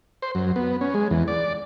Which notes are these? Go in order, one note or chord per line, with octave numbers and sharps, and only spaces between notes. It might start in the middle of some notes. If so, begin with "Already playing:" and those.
C5
F#2
B3
C#4
G#3
E2
D5